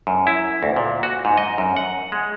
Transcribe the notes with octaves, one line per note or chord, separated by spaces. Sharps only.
F#2
E4
D2
A#2
F#4
G#2
D#5
F#2
F#5
G#3